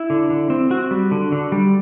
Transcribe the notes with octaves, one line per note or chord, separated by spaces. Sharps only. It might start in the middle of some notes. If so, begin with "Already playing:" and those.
Already playing: E4
D3
D3
C4
C4 F#4
G3
D3
D3
G3